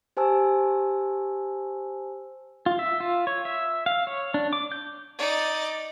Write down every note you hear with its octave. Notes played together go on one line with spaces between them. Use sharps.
G4 C5 G#5 A5 E6
F4
E5
F4
C#5
E5
F5
C#5
D4
D6
G6
D#4 D5